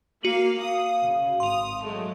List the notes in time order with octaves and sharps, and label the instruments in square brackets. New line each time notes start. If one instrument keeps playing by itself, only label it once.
[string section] A#3 F5 [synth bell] F#4 D#7 F#7
[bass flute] F5 [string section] D#6
[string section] C#3
[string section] G#1 D#6 [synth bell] C6 F7
[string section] F#3 G#3 A3